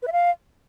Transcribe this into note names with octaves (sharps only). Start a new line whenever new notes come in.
B4
E5
F5